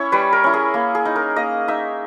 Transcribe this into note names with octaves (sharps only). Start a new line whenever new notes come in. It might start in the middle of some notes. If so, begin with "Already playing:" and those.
Already playing: C#4 E4 C#5
G3 B4
A#4
C#4 E4
G#4
A#3
G#4
D#4
A#4
A#3 D#5
D#4 E5